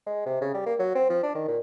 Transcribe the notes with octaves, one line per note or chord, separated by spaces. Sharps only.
G#3
C3
C#3
G3
A#3
F#3
C4
F3
D4
D#3
A#2